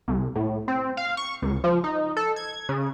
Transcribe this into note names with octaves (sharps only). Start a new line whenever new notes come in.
C2
A2
C4
F5
C#6
C#2
F3
D#4
A4
G#6
C#3